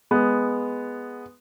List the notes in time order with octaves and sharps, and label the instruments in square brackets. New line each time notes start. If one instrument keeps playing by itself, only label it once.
[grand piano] G#3 B3